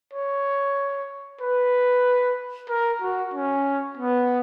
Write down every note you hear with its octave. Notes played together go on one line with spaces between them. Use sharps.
C#5
B4
A#4
F#4
C#4
B3